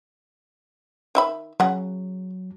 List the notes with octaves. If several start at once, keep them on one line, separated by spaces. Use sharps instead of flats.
D#3 E5 B5
C#3 F#3 F#5